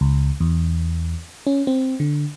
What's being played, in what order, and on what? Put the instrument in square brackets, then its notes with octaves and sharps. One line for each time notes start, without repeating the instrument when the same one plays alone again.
[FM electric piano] C#2
E2
C#4
C4
D3